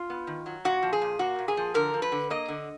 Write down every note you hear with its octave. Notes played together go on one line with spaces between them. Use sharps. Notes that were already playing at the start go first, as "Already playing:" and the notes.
Already playing: F4
B3
D#3
F#3
A#2 F#4
F3
G#4
A#2
A#3 F#4
A#2
G#4
F3
D3 A#4
F3
B4
D3
A#3 D#5
D3